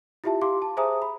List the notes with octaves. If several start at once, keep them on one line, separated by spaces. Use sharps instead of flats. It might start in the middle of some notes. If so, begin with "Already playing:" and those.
E4 F4 G4 E5 A5
G4 F5 C6 D6
A5
G#4 C5 E5 G#5 A#5 D#6
B5